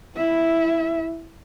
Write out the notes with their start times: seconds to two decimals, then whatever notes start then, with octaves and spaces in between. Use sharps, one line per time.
0.16 E4 E5